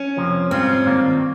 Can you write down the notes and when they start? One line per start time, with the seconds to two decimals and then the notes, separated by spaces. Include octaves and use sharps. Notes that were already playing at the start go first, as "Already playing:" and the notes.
Already playing: C#4
0.16 F2 C3 F3 A#3
0.51 G#2 G3 C4 C#4 F4
0.86 G2 D#3 A#3 F4